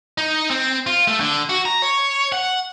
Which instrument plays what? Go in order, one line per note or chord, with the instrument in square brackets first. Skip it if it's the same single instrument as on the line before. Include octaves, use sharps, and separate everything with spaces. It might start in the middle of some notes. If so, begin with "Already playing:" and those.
[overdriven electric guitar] D#4
C4
F4
A3
D3
F#4
A#5
C#5
F#5